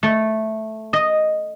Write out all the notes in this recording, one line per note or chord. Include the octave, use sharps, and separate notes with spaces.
A3
D#5